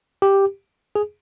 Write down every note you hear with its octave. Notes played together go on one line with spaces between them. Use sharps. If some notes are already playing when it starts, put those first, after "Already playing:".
G4
G#4